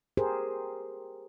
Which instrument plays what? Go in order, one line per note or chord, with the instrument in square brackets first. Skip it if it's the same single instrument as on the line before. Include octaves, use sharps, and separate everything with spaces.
[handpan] G4 G#4 A#4 C5